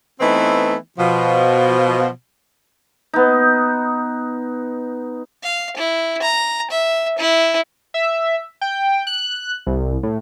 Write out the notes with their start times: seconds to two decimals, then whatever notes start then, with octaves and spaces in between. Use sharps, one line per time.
0.20 E3 A3 B3 C4 D#4 E4
0.98 B2 F3
3.13 B3 D#4
5.43 F5
5.77 E4
6.22 A#5
6.71 E5
7.18 E4
7.94 E5
8.61 G5
9.07 F#6
9.67 C2
10.03 A2